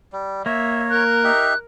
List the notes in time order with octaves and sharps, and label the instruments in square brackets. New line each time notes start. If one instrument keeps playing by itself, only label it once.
[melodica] G3
[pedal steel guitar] A#3 [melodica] C#5 [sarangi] E5
[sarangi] A#4 [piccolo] F#6
[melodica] D#4 G4 E5